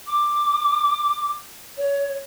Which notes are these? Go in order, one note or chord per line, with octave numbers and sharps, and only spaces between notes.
D6
C#5